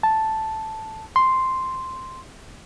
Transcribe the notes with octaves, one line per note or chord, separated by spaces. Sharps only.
A5
C6